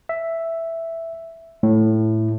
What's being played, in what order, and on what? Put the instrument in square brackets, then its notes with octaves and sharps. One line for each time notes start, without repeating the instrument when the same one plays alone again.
[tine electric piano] E5
[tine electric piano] A2 [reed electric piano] A3